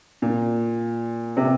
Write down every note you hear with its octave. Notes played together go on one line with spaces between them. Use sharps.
A#2
C3